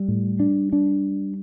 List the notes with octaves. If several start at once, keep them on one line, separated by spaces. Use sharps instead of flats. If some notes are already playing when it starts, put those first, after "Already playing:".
Already playing: G3
A2
D4
D4